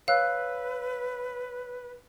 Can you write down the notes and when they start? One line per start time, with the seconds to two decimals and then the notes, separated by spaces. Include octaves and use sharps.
0.08 B4 C#5 F5 E6 F#6